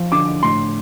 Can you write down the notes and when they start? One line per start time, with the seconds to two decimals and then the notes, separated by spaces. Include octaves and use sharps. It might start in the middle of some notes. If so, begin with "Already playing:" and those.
Already playing: F3
0.12 D3 D6
0.43 A2 C6